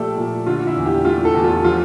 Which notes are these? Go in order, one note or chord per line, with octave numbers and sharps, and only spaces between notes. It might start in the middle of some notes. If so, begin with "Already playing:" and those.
Already playing: A#2 F3 A3 G4 A4 D5 E5
A#2
D3 F4
E4
E2
G4
A3 F4
A4
E2
F4
F3 F4